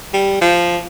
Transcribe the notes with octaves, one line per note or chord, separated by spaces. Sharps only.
G3
F3